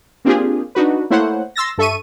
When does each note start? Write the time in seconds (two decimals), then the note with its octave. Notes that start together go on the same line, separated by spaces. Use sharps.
0.25 A#3 C4 D4 F4 G4 G#4
0.75 D4 D#4 F#4 B4
1.10 A3 A#3 E4 C5 C#5 F#5
1.56 C6 E6 A6 A#6
1.78 G2 A4 E5 C#6 D#7